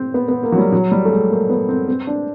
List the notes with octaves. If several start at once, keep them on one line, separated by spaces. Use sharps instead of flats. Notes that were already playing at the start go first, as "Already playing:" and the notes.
Already playing: C4
B3
B3
A#3
F#3
G3
F#3
G3
A3
G#3
A#3
B3
C4
C4
D4